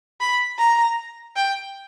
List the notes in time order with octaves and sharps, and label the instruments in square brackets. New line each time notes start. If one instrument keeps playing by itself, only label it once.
[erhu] B5
A#5
G5